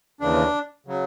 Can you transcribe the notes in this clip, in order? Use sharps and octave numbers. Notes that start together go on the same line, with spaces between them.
D#2 C#3 E3 D4
C#3 F#3